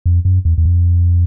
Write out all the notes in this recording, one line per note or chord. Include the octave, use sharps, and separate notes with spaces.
F2
F#2
E2
E2
F2